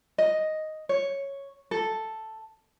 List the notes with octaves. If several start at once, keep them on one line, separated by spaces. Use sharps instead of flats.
D#5
C#5
A4